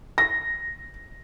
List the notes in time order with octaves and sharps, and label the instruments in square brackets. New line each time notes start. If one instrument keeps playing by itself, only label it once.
[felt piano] A#6